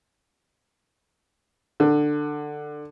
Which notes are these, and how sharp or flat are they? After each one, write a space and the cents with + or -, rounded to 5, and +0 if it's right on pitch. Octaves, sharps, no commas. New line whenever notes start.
D3 +15